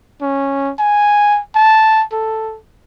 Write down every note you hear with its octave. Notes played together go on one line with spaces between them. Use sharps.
C#4
G#5
A5
A4